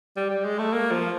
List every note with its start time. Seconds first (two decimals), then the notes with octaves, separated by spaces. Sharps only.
0.16 G3
0.30 G3
0.45 G#3
0.59 A3
0.73 A#3
0.91 F3